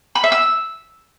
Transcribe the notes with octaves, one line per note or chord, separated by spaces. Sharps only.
B5
E5
E6